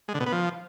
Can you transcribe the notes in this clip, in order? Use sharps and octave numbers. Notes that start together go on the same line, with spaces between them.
G#3
D3
B2
B3
F3